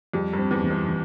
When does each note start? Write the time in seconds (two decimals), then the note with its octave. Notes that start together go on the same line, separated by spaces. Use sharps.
0.14 F2 G3
0.33 G2
0.38 C4
0.51 E2
0.64 E3
0.70 G2
0.89 E3